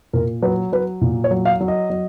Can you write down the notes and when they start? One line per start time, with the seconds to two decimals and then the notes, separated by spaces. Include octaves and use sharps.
0.13 A#2 A#4
0.42 F#3 B4
0.72 F#3 B4
1.01 A#2
1.24 C#5
1.31 F#3
1.45 F5
1.61 F#3
1.68 D#5
1.90 F#3